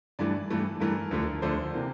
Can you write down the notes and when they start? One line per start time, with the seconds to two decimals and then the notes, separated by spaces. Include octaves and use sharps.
0.19 G2 E3 A3 D4 D5
0.50 G2 E3 A3
0.80 G2 E3 A3 A#4
1.11 D2 D3 F3 A3 D4
1.42 D2 D3 F3 A3 D4 C5
1.74 C3 E3 A#3